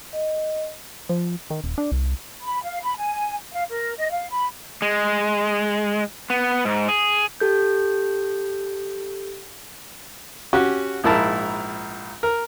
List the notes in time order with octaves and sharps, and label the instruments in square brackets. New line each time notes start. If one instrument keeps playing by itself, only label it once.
[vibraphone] D#5
[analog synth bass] F3
D#3
D#1
D4
C2
[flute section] B5
F5
B5
G#5
F5
A#4
D#5
F5
B5
[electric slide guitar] G#3
B3
G#2
G#4
[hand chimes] G4 A4 G6
[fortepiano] C#4 F#4 G4
A#1 G#2 E4 A#4 A5 B5
A#4